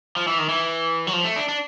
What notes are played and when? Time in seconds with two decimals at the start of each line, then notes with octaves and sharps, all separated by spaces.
0.16 F3
0.27 E3
0.38 D#3
0.49 E3
1.07 F#3
1.13 F3
1.24 A3
1.36 D4
1.49 D4